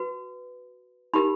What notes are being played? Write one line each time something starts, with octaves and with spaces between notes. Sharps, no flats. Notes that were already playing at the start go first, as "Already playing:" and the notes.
Already playing: F#4 B4
D#4 G4 A#4 B5